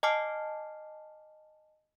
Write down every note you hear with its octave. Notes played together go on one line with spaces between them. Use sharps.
D#5 G#5 A5 D6 F6 C7